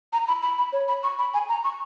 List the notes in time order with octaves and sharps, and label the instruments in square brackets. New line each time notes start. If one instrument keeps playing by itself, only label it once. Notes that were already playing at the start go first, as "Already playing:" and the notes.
[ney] A#5
B5
B5
B5
C#5
B5
C#6
B5
G#5
A#5
C#6